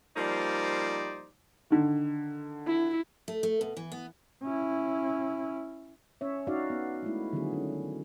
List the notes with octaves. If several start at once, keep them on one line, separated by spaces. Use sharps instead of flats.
F3 G3 A#3 D#4 C5 D5
D3 D#3
E4
A3
A3
B2
E3
B3
C#4 E4
C#4 C#5 E5
C#4 D#4 F#4 D5 E5 F5
B3
G#3 A3 E4
D3 D#3 F#3 G3 B3 G#4
C#4